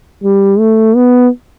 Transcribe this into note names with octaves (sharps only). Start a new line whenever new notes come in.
G3
A3
B3